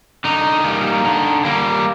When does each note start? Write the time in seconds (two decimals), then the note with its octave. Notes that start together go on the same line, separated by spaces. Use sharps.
0.24 D3 D#4
0.64 G3 A#3
1.04 D3
1.45 G3 A#3